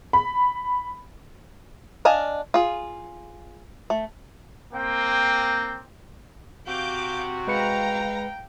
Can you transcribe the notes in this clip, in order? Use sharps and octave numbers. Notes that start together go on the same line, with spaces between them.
B5
D4 D#5 F5 G#5 A5
F4 G#4
A3
A#3 C4 G5
C3 F#4 F5 D6 G6
G#3 B4 F5 G5 A#5 C#7